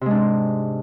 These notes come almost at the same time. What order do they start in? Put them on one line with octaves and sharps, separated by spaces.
C3 G#3 D4 G#2